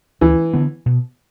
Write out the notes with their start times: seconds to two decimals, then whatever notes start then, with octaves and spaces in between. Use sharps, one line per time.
0.21 D2 E3
0.54 D3 B3
0.86 B2